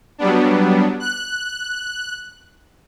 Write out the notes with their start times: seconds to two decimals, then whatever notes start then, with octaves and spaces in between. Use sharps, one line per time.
0.18 F#3 G3 B3 D4
1.00 F#6